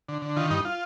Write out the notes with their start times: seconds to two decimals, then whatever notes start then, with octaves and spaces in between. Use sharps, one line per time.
0.08 D3
0.22 D3
0.36 D#3 F4
0.51 G2 D#4
0.65 F4